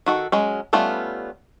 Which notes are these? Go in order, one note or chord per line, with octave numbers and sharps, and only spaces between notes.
D#3 F#4 A4
F#3 G#3 C#4
G3 A3 B3 C#4 F4